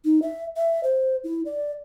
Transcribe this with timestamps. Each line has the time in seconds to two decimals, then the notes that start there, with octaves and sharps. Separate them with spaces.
0.05 D#4
0.22 E5
0.56 E5
0.83 C5
1.24 E4
1.45 D5